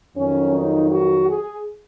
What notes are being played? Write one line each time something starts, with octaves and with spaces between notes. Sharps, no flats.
F2 D#3 F#3 C#4
D#4
F#4
G#4